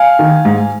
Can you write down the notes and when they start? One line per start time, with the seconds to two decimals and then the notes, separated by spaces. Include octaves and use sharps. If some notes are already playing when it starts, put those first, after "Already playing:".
Already playing: F5 G#5
0.19 D#3
0.45 G#2